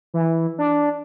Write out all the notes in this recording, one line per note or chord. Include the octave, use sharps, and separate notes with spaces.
E3
D4